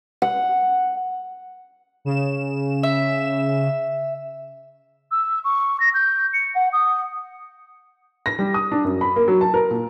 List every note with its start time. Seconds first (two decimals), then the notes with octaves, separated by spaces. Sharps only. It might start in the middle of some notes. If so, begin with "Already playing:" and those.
0.22 F#5
2.05 C#3 E7
2.83 E5
5.11 E6
5.44 C#6
5.80 A#6
5.94 G6
6.33 C#7
6.55 F#5
6.73 D#6
8.26 A#6
8.39 G3
8.54 D#6
8.72 D4
8.84 F#2
9.01 B5
9.16 A#3
9.28 F#3
9.41 A5
9.54 A#4
9.71 A#2